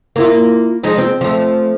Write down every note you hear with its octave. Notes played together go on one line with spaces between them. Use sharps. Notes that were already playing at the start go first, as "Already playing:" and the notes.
A#3 E4 F4
F3 G#3 D#4
C4
F3 A3